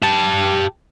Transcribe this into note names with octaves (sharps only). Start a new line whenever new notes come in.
G4 A5